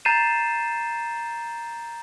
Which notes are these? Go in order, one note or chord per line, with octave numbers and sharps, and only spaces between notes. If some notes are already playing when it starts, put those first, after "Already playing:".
A#5 G6 A6 C7 D#7 E7